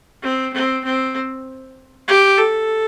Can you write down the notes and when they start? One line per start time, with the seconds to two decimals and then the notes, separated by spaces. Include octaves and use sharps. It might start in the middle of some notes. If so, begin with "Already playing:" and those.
0.23 C4
0.54 C4
0.84 C4
2.08 G4
2.38 A4